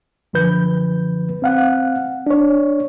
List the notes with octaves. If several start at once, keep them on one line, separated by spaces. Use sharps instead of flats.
F#2 D3 F3 B4 G6
C4 F5 F#5
D4 C#5